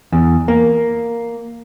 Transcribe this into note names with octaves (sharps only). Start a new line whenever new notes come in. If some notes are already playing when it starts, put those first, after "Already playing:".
E2
A#3